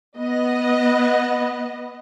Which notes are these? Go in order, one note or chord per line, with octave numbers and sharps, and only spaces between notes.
B3 D#5